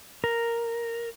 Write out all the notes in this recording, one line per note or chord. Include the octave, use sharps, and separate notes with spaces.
A#4